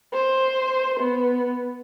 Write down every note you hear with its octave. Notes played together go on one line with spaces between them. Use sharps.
C5
B3